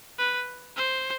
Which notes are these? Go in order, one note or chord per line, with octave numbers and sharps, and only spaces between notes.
B4
C5